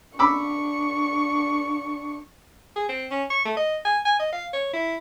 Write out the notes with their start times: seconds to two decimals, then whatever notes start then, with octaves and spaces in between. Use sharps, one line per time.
0.19 D4 B5 C#6 D6 E6
2.76 G#4
2.89 C4
3.11 C#4
3.30 C#6
3.46 A3
3.57 D#5
3.85 G#5
4.06 G#5
4.19 D#5
4.33 F5
4.53 C#5
4.73 E4